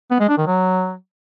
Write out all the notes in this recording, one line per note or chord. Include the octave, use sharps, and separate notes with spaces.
B3
G#3
D4
D#3
F#3